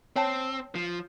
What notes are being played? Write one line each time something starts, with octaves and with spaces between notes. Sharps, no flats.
C4 C#5 G5 A5
F3